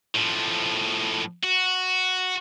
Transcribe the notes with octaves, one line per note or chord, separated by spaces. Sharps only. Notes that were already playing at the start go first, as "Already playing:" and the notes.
A2 F3
F#4